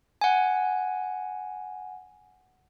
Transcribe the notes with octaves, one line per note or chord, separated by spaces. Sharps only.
F#5 G#5